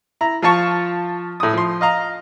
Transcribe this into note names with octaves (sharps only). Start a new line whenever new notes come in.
E4 A#5
F3 F4 F5 A5 C#6
A2 D#6
F3 C6
D#5 F5 A#5